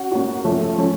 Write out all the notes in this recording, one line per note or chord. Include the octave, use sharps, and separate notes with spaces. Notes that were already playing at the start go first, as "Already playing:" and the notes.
Already playing: C#4 F#4
A#3 C#4 F#4
F3 A3 C#4
F3 A3 C#4